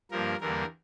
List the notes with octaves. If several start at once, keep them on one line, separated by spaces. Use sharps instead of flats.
G2 F3 A#3 A#4
E2 D3 G3 A#3 A#4